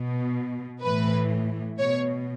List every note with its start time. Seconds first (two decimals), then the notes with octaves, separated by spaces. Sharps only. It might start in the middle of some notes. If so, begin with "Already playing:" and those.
Already playing: B2
0.83 A2 E3 B4
1.79 B2 C#5